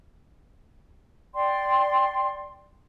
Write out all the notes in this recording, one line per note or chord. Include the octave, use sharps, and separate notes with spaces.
D5 G5 C6